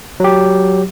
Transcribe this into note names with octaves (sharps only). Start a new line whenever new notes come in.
F#3 G4